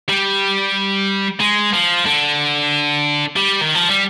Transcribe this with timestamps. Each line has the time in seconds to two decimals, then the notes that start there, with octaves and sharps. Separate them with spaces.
0.09 G3
1.40 G#3
1.73 F3
2.06 D3
3.36 G3
3.61 D#3
3.75 F3
3.89 G3